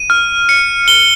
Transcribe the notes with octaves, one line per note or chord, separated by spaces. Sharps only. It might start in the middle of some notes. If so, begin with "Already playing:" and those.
Already playing: D#7
F6
C#7
G7